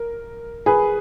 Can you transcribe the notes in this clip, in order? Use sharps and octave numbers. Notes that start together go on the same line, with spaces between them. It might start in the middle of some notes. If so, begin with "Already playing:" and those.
Already playing: A#4
G#4 B4